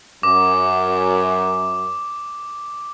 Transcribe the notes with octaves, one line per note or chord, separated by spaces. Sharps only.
F#2 D6